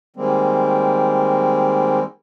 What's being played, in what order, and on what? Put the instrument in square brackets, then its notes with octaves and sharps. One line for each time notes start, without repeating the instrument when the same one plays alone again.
[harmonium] D#3 G3 G#3 A#3 C4